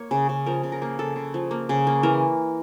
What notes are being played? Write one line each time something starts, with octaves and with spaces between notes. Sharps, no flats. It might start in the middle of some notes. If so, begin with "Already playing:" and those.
Already playing: A#3 C#5
C#3
C#3
F3 A#4
C#3
A#4
A#3
C#3 A4
C#3
F3
A#3
C#3
A#3
E3 A#4